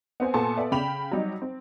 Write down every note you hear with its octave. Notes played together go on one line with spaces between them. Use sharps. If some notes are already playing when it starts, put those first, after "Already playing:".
B3 C4 C5 G#5
A#2 B3 A4 G#5 A5 C6
B3 D5 E5
C#3 G5 B5 E7 F7
F#3 G3 D#4
C4